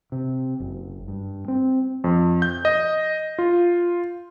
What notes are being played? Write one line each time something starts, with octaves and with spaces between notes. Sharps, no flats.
C3
F#1
G2
C4
F2
G6
D#5
F4